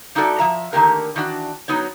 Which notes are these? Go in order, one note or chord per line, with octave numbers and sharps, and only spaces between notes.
G3 D#4 E4 F#4 A4 D5
F3 E5 A#5
D3 D#3 A3 A#3 G4 A#4
D#3 E3 D4 F#4
F#3 B3 D#4 C#5